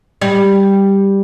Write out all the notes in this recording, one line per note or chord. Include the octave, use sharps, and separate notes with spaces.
G3